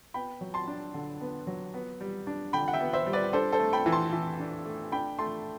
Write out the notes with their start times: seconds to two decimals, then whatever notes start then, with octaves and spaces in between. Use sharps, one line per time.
0.14 B3 G5 B5
0.41 F#3
0.54 A5 C6
0.68 D4
0.94 D3
1.21 B3
1.47 F#3
1.74 B3
2.01 G3
2.27 D4
2.53 D3 G5 B5
2.68 F#5
2.73 E5 G5
2.81 B3
2.93 C5 E5
3.06 G3
3.13 B4 D5
3.33 D4 A4 C5
3.52 A4 C5
3.59 A3
3.73 G5 B5
3.86 E3
3.92 A5 C6
4.12 E3
4.39 D4
4.65 A3
4.92 D4 G5 B5
5.18 A3 A5 C6